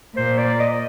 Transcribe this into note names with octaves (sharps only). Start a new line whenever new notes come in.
A#2 C5
D5
D#5